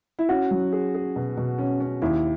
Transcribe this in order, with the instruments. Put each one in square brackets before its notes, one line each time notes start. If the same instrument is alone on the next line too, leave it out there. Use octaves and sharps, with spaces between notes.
[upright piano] E4
[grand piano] C#4 [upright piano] F#4
[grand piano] F#3
G#4
G#4
B2
B2
C#4
C#4
[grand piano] D#2 [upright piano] E4